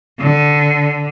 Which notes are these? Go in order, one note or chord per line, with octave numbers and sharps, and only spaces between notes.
D3